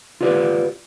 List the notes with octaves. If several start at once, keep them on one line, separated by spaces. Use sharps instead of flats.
F4 G4 B4 D5